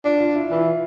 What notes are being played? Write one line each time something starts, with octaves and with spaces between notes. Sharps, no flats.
D4 F4
F4
E4
E3 F4